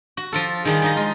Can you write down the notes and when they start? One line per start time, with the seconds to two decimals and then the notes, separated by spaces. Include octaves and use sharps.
0.17 F#4
0.33 F3 F4 A4
0.65 D#3 F3 G3 G#4
0.82 F3 D#4 D#5
0.97 G#3 F4